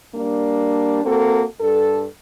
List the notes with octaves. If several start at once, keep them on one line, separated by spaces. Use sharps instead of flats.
G3 A#3 D4
A#3 C4 F#4 A4
G2 A4